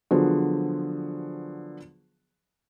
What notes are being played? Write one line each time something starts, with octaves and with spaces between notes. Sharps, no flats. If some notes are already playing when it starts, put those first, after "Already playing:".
D3 F3 F#3 B3 G#4 C5